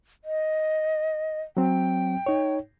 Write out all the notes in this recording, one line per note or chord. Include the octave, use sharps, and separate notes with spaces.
D#5
F#3 C4 G5
D#4 C#5